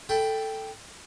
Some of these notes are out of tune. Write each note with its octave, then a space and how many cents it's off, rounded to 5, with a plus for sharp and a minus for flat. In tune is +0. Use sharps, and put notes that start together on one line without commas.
A4 +0 G5 +0 B5 +15